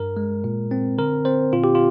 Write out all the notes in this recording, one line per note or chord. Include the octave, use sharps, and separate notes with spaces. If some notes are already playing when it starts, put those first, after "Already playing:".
Already playing: G2 A#4
G#3
A#2
C4
D3 A#4
C4 C5
A#2 F4
G4
F4